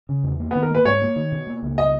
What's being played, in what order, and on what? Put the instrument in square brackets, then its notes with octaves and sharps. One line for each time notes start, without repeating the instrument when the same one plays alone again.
[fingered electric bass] C#3
E2
A#3
[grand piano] B3
[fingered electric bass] D#3
[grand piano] A#4
[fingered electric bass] A#3 [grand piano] B4
[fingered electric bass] G#2 [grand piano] C#5
[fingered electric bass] A#3
D#3
B2
A#3
C#2
[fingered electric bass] B2 [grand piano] D#5